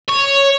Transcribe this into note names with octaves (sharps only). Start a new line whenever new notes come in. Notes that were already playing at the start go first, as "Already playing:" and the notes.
C#5